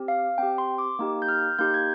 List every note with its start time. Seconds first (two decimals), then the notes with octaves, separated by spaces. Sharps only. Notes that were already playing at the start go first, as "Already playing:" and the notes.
Already playing: C4 G4
0.08 F5
0.38 C4 G4 G5
0.58 C6
0.78 D6
0.99 A#3 D#4 G4
1.22 G6
1.29 F6
1.59 A#3 D#4 G4 G6
1.74 G#6